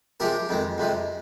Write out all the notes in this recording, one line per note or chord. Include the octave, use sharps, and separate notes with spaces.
C3 F3 G#3 G4 A#4
F2 D#3 G#3
F2 C3 F3 G#3